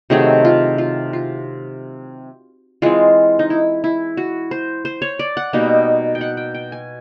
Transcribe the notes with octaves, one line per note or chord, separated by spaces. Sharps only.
C3 D#3 F#3 A3 G#4
F4
F4
F4
E3 G#3 C4 F4
D#4
E4
E4
F#4
C5
C5
C#5
D5
F#5
B2 G3 A#3 D#4
G5
F#5
G5
G5
G#5